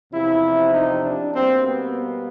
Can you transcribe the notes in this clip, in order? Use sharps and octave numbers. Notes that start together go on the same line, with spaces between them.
E2 C3 F3 E4
D#4
D4
B2 G3 A#3 C4
B3